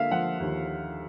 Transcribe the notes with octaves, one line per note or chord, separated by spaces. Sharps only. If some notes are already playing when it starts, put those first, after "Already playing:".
Already playing: D3 A#3 E5 F5
F3 F#5
D#2